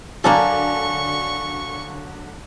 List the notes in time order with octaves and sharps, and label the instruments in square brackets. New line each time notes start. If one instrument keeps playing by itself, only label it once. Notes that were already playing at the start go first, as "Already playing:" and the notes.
[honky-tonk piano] D3 F#3 [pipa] A#3 D4 A4 [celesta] F5 G#5 [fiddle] C#6